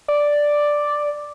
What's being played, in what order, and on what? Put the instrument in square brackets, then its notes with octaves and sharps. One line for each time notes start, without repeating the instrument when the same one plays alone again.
[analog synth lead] D5